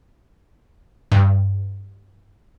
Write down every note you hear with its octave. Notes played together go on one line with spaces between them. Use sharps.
G2